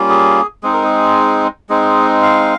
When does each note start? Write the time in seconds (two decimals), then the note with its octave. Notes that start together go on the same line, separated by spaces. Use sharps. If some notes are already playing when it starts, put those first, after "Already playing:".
Already playing: G3 A#3 C#4 F4
0.09 G#4
0.63 G#3 C4 D#4 G#4
0.73 A#4
0.84 G#4
1.69 G#3 C4 D#4 G#4
2.22 F5